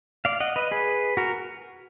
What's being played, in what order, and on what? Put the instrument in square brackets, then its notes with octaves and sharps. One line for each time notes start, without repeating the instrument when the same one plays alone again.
[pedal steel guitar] D5 F5
D#5 F#5
B4 D#5
G#4 B4
F#4 A#4